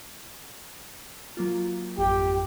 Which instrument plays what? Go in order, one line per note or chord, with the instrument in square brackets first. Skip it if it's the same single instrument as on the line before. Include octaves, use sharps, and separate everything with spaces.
[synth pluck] F#3 A#3 F4
[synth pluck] G#1 F2 G5 [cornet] G4